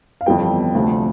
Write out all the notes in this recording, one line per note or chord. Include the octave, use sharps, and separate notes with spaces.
F5
G1 F2 E3 G3 B3 G5
D2 C3 F3 A3